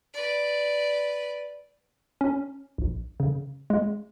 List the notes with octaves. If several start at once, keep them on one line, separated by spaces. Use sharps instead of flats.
B4 D5
C#4
A#1
C#3
G#3